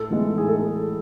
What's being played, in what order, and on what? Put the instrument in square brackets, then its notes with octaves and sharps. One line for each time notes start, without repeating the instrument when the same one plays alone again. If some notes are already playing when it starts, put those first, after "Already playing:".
Already playing: [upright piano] A2 A4
E3 G#3 B3
A2 G#4
A4